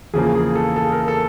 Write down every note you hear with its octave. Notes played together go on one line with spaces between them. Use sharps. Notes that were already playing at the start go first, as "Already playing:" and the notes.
E2 C#3 F3 A#3 G#4
G#4
A4
A4
A#4
A4